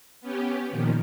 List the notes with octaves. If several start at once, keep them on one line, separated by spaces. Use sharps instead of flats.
B3 C#4 G4
A#2 D#3 F3